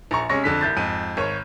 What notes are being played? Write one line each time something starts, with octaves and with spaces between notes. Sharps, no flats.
A#1 A#5 C#6
C3 G#3 C#4 C#6 A#6
F2 D3 B6
C2 G6 A6
F2 G#2 D#7
G#1 C#5